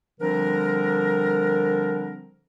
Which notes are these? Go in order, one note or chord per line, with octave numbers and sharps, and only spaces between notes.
D3 F3 G3 C4 D4 A#4